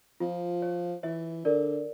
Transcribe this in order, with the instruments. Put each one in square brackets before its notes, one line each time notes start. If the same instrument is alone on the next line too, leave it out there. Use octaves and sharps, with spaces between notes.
[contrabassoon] F3 [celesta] F4
[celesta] C#5
[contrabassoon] E3 [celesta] C#5 E5
[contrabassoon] D3 [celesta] A#4 D5